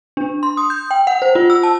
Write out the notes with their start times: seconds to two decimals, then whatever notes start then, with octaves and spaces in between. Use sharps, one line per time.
0.17 D4
0.43 C6
0.57 D#6
0.70 G6
0.91 G5
1.07 F#5
1.22 C5
1.35 F4
1.50 E6
1.63 A5